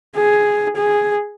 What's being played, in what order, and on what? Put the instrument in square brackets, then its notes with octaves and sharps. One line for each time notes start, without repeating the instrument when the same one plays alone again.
[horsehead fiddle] G#4
G#4